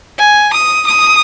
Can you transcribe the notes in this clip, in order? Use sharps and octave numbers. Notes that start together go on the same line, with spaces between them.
G#5
D#6
D#6